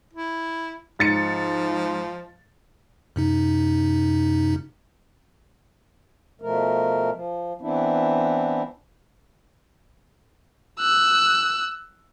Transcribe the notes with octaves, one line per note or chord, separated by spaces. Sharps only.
E4
G#2 F3 A6 C#7
F#2 C3 D#4
B2 F3 A3 A#4
F3
E3 B3 C4 D4 E4
E6 F#6